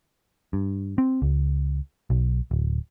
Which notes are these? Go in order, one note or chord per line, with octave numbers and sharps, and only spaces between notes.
G2
C4
C#2
B1
D1